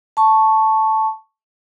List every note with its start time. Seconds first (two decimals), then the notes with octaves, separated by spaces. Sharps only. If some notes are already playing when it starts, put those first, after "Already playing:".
0.17 A5 C#6